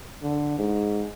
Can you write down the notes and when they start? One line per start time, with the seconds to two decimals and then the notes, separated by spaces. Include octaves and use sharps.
0.23 D3
0.59 G#2